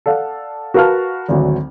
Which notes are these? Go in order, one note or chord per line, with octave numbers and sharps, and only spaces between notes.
A4 D5 F5 F#5
F#4 A#4 B4 F5 A5 F6
G#1 D2 F#3